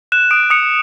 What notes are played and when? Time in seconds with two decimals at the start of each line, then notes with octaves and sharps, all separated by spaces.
0.12 F#6 E7
0.31 D#6 D7
0.50 D#6 C#7